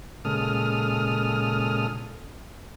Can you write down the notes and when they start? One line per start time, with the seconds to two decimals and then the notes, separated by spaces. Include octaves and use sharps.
0.25 A#2 C#3 G#3 A4 D#6 F6